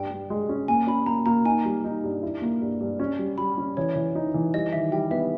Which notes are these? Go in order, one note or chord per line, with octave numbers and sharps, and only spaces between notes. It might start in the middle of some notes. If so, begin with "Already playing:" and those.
Already playing: G2 G5
G2
G#3
C#4
A#3 G#5
C#4 B5
A#3 A#5
A#3 A#5
D#4 G#5
G3
D#4
G2
E4
A#3
G2
G2
C#4
G3
G3 B5
C#4
E3 C#5
E3
D#4
E3
G3 D#5
D#3 E5
G3 G5
B3 E5